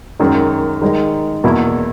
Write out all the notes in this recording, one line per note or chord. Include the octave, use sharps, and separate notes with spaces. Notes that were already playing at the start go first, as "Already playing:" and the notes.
F#2 D#3 G#3
D#3 G#3 D#4 A#4
E2 B2 A#3 E4